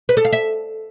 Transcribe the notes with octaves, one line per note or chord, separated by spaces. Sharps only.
B4
A4
F5
E5